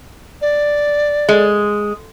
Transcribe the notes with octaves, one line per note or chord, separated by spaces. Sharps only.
D5
G#3